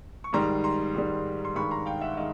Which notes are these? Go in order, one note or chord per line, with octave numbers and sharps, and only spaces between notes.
C#6
G#2 D#3 G3 A#5 C6
A#5 C6
G#2 D#3 G3
C6
G2 D#3 G#3 B5 C#6
A#5 C6
F5 G5
E5 F#5
D#3 G#3 D#5 F5